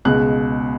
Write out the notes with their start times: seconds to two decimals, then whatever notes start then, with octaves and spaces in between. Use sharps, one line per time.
0.05 C#2 B2 G#3 F#6